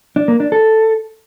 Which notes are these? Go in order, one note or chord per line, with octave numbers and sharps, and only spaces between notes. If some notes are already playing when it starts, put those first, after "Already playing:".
D4
A#3
D4
A4